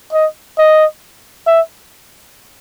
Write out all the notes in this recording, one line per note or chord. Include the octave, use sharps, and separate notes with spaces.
D#5
D#5
E5